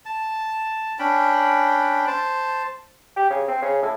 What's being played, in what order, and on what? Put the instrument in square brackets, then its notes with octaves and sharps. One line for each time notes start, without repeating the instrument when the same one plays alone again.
[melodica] A5
C#4 D4 G5 B5
C5 A5
[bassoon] G4
C#3
C4
C#3
A2